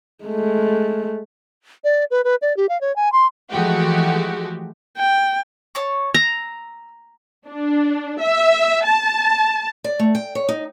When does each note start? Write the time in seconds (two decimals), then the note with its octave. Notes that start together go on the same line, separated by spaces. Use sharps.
0.25 G#3 A3
1.84 D5
2.11 B4
2.24 B4
2.42 D5
2.57 G4
2.69 F5
2.81 C#5
2.96 G#5
3.12 C6
3.50 E3 F3 G#3 A3 F#4 G4
4.97 G5
5.75 C#5 A5 C#6
6.14 A#5 E6
7.48 D4
8.21 E5
8.85 A5
9.84 D5
9.99 A3
10.15 G5
10.35 C#5
10.49 D#4